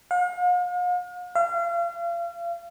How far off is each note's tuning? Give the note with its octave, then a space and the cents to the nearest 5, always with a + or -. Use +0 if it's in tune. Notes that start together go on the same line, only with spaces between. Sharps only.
F5 +45
F5 -35